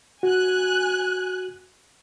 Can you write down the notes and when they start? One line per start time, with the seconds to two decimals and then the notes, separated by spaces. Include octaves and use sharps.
0.23 F#4 G#5 F#6